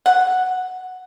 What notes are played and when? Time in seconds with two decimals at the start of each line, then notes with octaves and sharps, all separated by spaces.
0.06 F#5